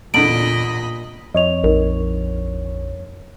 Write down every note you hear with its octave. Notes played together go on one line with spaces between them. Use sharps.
E2 A#2 D3 D#5 B5 D7 F#7
F2 C#5 D#5 F7
A#1 D#4 A#4